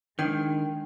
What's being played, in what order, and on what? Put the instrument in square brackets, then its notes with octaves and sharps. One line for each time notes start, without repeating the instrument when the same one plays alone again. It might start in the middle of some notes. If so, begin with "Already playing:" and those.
[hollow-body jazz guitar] D#3 [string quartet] G#3 [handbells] D4 G5 G6